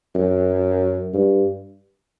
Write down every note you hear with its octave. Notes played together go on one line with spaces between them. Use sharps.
F#2
G2